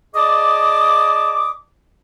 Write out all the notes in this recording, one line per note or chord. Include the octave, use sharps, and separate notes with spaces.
G#4 D5 D#5 A5 D6 D#6